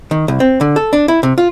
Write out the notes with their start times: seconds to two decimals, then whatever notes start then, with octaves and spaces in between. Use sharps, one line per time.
0.11 D#3
0.28 C2
0.40 C4
0.61 D3
0.76 A4
0.93 D4
1.08 E4
1.23 C3
1.38 F4